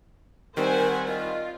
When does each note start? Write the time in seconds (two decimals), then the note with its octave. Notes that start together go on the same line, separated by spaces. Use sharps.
0.57 D#3 G3 C4 A#4 C5 F#5 G#5
1.08 F4 D#5